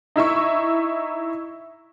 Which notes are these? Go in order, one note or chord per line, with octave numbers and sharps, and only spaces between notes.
D#4 E4 E5 C#6